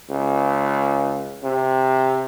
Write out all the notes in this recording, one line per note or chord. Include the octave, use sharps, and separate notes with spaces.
C#2
C3